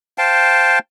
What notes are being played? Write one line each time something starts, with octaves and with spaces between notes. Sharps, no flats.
C5 F5 G5 A5